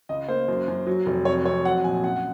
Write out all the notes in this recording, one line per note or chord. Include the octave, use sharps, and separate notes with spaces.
C#2 D#5
A#3 C5
F#2
F#2
F#3
F1
F2 C#5
F2 C#5
F#3 F#5
A#1 G#5
F#2 F#5